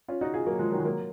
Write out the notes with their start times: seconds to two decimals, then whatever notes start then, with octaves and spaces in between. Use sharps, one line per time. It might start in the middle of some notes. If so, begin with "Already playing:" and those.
0.08 C#4 F4
0.21 D#4 F#4
0.34 F4 G#4
0.46 F#3 A#3
0.59 F3 G#3
0.72 D#3 F#3
0.80 G#3
0.85 F#3 A#3